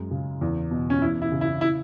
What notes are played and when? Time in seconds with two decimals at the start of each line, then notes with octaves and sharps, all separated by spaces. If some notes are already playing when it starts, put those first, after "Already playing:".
Already playing: F#2 G#3
0.11 C#3
0.41 E2
0.71 B2
0.90 C#4
1.02 E2 E4
1.22 E4
1.32 C#3
1.41 E4
1.61 E4